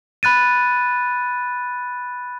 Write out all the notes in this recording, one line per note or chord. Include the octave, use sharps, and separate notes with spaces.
B5 F#6 A6 D#7